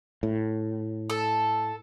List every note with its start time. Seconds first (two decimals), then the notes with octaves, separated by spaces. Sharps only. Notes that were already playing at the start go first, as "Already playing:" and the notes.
0.23 A2
1.10 A4 E6